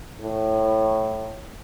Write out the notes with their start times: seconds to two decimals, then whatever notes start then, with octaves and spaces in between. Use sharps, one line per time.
0.21 A2